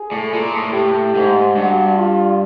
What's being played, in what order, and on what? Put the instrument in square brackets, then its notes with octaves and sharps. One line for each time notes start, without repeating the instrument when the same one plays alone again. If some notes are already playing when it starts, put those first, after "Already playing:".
Already playing: [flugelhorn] G#4
[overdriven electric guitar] A2
A#2
A2
[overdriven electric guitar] A2 [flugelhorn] G4
[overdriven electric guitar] G#2
[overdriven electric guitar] G2 [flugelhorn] F#4
[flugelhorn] F4